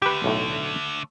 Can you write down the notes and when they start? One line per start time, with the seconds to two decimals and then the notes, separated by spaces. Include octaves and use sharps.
0.02 D3 A3 G4 B4
0.24 B1 A2